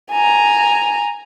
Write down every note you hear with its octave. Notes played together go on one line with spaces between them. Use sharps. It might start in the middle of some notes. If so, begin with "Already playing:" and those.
G#5 A#5